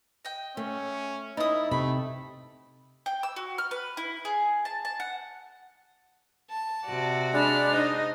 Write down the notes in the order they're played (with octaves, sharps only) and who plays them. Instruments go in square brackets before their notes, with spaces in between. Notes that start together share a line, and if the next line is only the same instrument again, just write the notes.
[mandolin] D#5 G5
[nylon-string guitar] A3 [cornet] C#4
[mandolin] B3 D#6 [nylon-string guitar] D#4 [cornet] E4
[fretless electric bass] C3 [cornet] A3 [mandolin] B5
[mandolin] G5
E6
F#4
F6
B4
E4
G#4
A5
A5
F#5
[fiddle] A5
[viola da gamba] C3 F#4 D5
[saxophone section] G#3 D4 [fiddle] B5 F6
[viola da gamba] D#4 D#5 [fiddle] C5